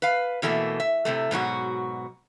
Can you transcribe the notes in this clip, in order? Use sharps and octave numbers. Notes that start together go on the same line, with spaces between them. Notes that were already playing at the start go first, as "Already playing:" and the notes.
B4 F5
B2 E3 G3 A3 A#3
E5
A2 C3 G#3 A3
G#2 B2 F#3 F#4